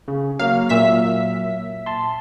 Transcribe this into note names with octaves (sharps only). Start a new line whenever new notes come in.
C#3
F#3 A#3 F5
A#2 E5 B6
A5 C6